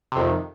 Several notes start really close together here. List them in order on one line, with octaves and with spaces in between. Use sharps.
C3 F2 D#3